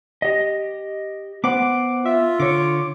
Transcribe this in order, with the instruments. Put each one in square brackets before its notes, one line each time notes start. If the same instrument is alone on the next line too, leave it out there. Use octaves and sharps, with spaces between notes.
[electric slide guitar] G4 D#5
[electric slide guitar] B3 C5 F#5 [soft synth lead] D6
[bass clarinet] F4 [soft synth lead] E5
[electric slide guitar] D3 C#5 [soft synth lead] D6